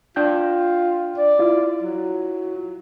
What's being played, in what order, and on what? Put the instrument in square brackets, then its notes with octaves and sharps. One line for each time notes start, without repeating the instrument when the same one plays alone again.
[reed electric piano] D4 G5 G6 [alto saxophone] F4
[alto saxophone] D5
[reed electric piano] E4 F4
[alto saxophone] F#3